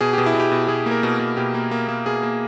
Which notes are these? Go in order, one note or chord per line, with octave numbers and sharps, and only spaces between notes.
B2 G#4
B2 G4
E4
B2
G4
B2
B2 G#4
A#3
A#4
B2
B2
B2 G4
A#3
A#3
A#3
B2 G#4
A#3